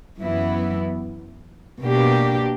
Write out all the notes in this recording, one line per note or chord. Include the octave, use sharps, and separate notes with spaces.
F#2 E3 B3 E4
B2 A#3 D4 G4